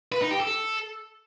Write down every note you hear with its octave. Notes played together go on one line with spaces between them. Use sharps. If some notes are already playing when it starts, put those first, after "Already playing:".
B4
D#4
G4
A4